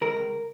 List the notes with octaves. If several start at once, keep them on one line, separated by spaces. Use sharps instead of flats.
C#2 A#4
C#2